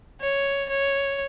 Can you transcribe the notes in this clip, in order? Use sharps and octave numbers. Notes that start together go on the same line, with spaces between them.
C#5
C#5